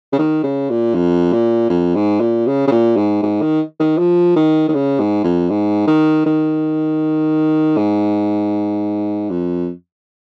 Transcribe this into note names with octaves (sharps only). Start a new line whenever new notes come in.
C#3
D#3
C#3
A#2
F2
A#2
F2
G#2
A#2
C#3
C#3
A#2
G#2
G#2
D#3
D#3
F3
D#3
D#3
C#3
G#2
F2
G#2
D#3
D#3
G#2
F2